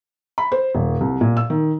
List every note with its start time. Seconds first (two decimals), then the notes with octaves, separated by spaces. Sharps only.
0.38 B5
0.52 C5
0.75 D#1
1.01 C2
1.21 A#2
1.37 E6
1.50 D#3